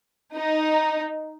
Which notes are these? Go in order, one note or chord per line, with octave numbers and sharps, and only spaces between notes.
D#4